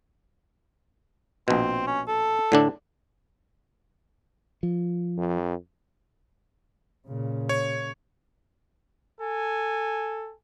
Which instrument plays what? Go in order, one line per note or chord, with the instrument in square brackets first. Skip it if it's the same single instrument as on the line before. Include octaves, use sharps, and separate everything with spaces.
[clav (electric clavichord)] A#1 B2 [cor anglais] C4
[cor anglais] C#4
A4
[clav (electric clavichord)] A2 D3 D4
[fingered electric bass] F3
[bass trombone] F2
[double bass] A#2 C#3
[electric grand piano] C#5
[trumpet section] A4 G#5